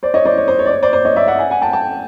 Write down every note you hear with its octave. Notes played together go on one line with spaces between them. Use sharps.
C5 D5
C#5 D#5
C5 D5
C#5
C5
C#5
D5
C#5
C5 D5
C5 D5
C#5 D#5
D5 E5
E5 F#5
F#5 G#5
F#5 G#5
G5 A5
G5 A5